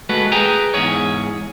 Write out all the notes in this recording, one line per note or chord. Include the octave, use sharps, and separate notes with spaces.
G#3 A3 F#4 B4
G#4 B4 G5 G#5 A#5
E2 G#2 G#4 C#5